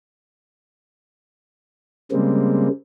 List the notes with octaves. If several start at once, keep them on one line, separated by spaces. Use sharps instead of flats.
C#3 G3 G#3 A#3 C4